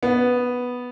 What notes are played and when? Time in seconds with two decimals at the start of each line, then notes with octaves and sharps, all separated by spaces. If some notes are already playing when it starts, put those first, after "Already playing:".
0.03 B3